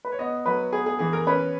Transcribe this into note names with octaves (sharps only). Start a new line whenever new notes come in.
B4
C#5
B3 D#5
F#3 B4
B3 G#4
G#4
E3 G#4
A#4
C#4 B4